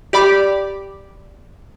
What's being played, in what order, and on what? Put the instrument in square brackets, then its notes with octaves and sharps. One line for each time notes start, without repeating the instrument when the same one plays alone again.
[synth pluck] G4 D5 B5 D6